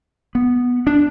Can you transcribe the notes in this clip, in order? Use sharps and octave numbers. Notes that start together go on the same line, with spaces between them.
B3
D4